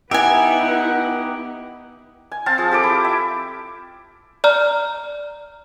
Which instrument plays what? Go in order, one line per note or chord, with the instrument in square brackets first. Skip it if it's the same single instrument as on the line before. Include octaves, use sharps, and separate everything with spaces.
[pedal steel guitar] B3 D#4 G4 [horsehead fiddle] E4 B4 [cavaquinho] E5 G#5 [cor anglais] F#5
[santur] G#5
C4 F5 A5
F3 G#4
G4 A4 D6
E4
E5
[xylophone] D5 A#5 F6